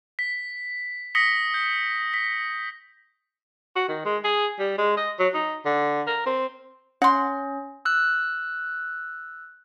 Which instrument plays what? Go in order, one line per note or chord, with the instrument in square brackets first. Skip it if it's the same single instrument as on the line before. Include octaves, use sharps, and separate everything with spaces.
[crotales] B6
D#6 A#6 B6 C#7 G7
G6
B6
[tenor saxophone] F#4
D#3
G#3
G#4
G3
G#3
D#5
F#3
D#4
D3
A#4
C4
[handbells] C#4 [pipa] F#5 C6
[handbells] E6 F#6